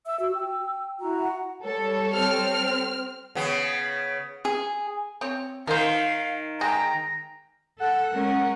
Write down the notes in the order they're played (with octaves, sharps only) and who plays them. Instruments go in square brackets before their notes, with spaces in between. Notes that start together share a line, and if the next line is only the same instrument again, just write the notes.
[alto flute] E5 [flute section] E6
[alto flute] F#4 [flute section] E6
[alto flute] G5
[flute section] E4 F#4 A#5
[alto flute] F#5
[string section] G3 A4 C#5
[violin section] C4 F6
[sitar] C#3 B3
[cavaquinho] G#4
[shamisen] C4 C#5
[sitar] D#3 [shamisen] A#4 C5 [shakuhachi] F5
[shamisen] G#3 [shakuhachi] G5 [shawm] A#5
[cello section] A4 [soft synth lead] F#5
[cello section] G#3 C#4 A#4